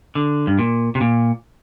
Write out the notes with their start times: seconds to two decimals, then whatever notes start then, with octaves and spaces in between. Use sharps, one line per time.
0.15 D3
0.47 G2
0.59 A#2
0.95 C3
1.01 A#2